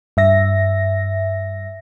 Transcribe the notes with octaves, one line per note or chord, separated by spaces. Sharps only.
G2 E5 A#6